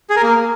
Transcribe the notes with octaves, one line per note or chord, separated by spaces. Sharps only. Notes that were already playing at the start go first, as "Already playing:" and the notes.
G#4
A#4
A#3